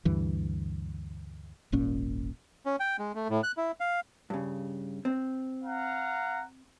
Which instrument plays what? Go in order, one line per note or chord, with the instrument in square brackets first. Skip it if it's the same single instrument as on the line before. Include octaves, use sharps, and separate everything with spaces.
[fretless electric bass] D2 G2 E3
D#1 G#1 A#2 C#4
[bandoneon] C#4
G5
G#3
A3
A2
F#6
E4
F5
[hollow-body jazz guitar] G2 C#3
C4
[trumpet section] F5 F#5 A#5